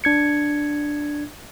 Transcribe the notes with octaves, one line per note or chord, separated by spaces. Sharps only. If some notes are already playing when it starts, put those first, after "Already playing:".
D4 G#6 C#7